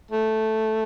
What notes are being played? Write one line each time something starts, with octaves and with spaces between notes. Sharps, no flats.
A3